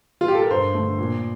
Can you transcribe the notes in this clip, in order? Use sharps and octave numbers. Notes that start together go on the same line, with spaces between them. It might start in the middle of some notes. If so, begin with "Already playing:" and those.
F4
G4
A4
A#4
G2 C5
D3 A3
A#2